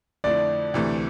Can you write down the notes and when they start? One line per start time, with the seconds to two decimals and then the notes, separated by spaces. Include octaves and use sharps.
0.24 F2 D3 A3 E4 D5
0.74 D2 C3 E3 A3